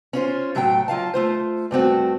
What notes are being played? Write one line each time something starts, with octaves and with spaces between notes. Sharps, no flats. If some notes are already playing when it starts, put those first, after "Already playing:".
C#4 F4 C5
A2 F#3 A3 B4 G5
F#3 F4 F5 A5
A3 F4 C5
G2 A3 C4 F#4